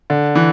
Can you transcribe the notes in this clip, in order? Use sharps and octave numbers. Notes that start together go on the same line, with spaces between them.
D3
E3